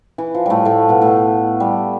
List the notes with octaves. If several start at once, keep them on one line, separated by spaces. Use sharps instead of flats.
E3
F3
A2 G3 A3
A2 A3
B2 B3
A2 A3
G3